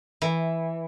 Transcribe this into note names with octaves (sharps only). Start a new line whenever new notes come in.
E3